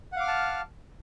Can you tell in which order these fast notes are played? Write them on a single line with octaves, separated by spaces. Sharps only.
F#5 F5 D6 F6 A5